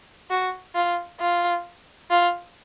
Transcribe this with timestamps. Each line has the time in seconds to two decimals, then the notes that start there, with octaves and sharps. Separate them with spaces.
0.30 F#4
0.75 F4
1.20 F4
2.10 F4